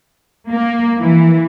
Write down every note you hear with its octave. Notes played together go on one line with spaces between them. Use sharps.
A#3
E3